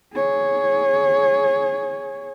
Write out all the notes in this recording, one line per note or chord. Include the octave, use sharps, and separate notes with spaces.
G#4 C#5